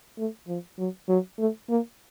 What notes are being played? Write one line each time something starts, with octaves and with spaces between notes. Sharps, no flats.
A3
F3
F#3
F#3
A3
A#3